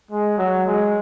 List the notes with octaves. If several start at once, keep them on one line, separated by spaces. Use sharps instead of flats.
G#3
F#3
G#3